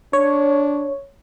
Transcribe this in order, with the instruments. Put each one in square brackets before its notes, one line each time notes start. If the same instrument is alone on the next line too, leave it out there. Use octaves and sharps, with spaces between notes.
[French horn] D4 [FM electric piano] C#5